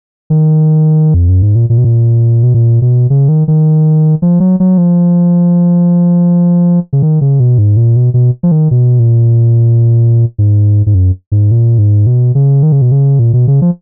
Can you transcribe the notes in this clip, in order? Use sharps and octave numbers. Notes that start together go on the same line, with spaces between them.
D#3
F2
F#2
G#2
A#2
A#2
B2
A#2
B2
A#2
B2
C#3
D#3
D#3
F3
F#3
F#3
F3
C#3
D#3
C#3
B2
G#2
A#2
B2
B2
F3
D#3
B2
A#2
G#2
G#2
F#2
G#2
A#2
G#2
B2
C#3
D#3
C#3
B2
C#3
A#2
B2
C#3
F3